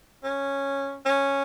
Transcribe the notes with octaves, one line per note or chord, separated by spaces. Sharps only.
C#4
C#4